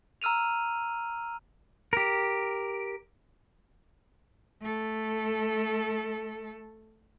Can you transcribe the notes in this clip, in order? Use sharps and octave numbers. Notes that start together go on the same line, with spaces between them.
A#5 E6 F6 D#7 F7
G4 A#4
A3 A4